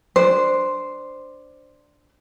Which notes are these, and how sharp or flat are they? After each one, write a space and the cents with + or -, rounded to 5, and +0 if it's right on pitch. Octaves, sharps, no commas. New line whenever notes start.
D4 +0 C5 +0